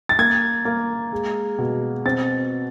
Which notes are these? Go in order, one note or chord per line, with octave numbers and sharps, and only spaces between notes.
A6
A#3 G#6
A#3
G#3
B2
C4 A6